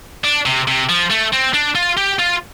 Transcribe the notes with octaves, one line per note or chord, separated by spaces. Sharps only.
D4
C3
C3
F3
A3
C4
D4
F4
G4
F4